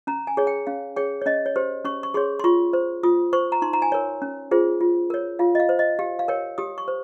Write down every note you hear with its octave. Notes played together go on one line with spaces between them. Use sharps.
C#4 A#5
G#5
G#4 C#5
G5
C#4 F5
G#4 C#5 G5
C#5
C#4 D#5
C#5
G4 C5
C#4 C#6
C#6
G#4 C#5 C6
C6
F4 C#6
C5
F4 D#6
C5 C#6
A#5
D#4 C6
A#5
G#5
A#4 C#5
C#4
F4 G#4 C5
F4
A#4 C#5
F4 F5
D#5
F5
C5
D#5
G4 F5
F5
A#4 C#5 G5
G4 D#6
C#6
C5